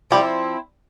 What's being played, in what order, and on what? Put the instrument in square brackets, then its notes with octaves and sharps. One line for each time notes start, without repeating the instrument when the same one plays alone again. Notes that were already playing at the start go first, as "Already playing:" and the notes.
[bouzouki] F3 C4 E4 [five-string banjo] G3